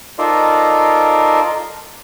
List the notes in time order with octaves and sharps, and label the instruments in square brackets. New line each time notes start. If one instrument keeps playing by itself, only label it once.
[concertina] D#4 F4 A4 A#4 C5 D5